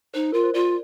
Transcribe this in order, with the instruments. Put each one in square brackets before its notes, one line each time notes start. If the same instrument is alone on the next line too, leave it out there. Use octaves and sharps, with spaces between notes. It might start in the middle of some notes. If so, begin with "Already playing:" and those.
[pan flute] D#4 [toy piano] C5
[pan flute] F4 [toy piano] A#4
[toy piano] C5
[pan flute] F4 [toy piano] D5